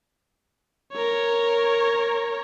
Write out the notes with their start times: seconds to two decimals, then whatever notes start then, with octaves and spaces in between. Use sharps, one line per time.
0.93 A#4 C#5